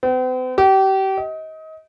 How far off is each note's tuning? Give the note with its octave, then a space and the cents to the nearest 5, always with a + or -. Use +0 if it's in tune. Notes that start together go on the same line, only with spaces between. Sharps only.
C4 -45
G4 -30
D#5 +30